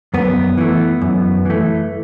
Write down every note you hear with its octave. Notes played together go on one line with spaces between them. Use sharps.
F#2 B3
E3 A3
F#2
E3 A3